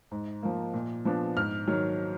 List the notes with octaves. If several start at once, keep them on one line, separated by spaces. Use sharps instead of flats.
G#2
F3 A#3
A#2
F3 B3 D4
G#2 F6
D#3 F#3